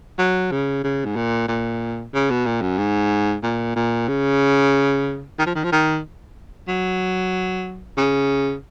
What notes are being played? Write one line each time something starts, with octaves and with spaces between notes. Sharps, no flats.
F#3
C#3
C#3
G#2
A#2
A#2
C#3
B2
A#2
F#2
G#2
A#2
A#2
C#3
D#3
F3
D#3
F3
D#3
F#3
C#3